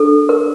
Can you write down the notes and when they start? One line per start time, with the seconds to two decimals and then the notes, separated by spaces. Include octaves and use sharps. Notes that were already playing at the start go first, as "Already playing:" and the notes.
Already playing: D4 A4
0.29 A#4